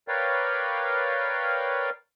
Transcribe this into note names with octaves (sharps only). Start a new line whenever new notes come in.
A#4 B4 C#5 D5 F5 G5